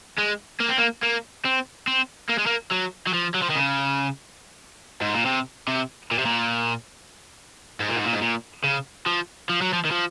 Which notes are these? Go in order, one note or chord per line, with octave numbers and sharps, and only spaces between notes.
G#3
A#3
C4
A#3
A#3
C4
C4
A#3
G#3
A#3
F#3
F#3
F3
F#3
F3
D#3
C#3
G#2
A#2
C3
C3
A#2
C3
A#2
G#2
A#2
G#2
A#2
G#2
A#2
C#3
F3
F3
F#3
F3
D#3
F3